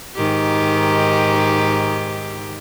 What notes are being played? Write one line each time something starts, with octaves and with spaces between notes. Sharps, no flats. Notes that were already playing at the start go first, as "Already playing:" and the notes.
G#2 D#3 G4